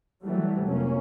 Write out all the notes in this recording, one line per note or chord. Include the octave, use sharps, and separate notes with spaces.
E3 F#3 G3 A3
F1 A#3 C#4